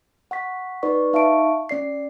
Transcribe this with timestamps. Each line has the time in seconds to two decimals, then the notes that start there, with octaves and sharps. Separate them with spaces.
0.31 F#5 C#6 B6
0.83 D#4 B4 D5 C#6
1.13 D#4 E5 F5 A5 C#6 D7
1.69 C#4 D5 C7